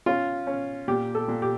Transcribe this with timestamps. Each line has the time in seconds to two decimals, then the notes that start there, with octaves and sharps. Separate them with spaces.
0.06 C#4 F4
0.47 C#4
0.88 A#2 G4
1.15 A4
1.28 A#2
1.42 G4